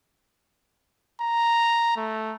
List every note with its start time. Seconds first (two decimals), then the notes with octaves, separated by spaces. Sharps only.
1.21 A#5
1.97 A3